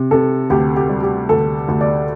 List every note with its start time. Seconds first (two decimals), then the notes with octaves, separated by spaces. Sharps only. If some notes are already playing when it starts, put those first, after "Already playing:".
Already playing: C3
0.11 C3 A4
0.50 D2 G4
0.76 G4
0.89 G3
1.03 G4
1.29 D2 A4
1.68 D2
1.81 D5